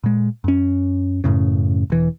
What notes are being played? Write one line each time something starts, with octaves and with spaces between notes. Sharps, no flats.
A#2 G#3
F#2 C#4
F#2 A2 C#3
E1 E3